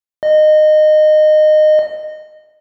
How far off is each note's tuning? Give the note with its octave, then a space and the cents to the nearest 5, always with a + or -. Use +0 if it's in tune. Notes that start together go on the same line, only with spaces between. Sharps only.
D#5 -20